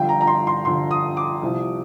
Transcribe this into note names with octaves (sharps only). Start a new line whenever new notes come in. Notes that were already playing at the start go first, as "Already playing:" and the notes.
Already playing: G1 G2 D3 F3 G5
A#5
A#5
C6
C6
G1 G2 D3 F3 C6
D#6
D6
C2 C3 F3